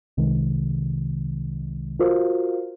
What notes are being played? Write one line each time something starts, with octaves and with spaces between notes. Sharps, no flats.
C2 C3 D#3 G#3
F4 F#4 A#4 C5 F5